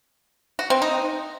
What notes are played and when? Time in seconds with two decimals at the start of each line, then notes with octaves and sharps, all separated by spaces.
0.59 F#4
0.70 C4
0.82 D#4